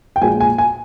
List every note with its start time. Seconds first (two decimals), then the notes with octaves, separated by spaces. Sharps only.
0.16 G5
0.22 A#1 A#2 F3 G#3 G#5
0.40 G#5
0.58 G#5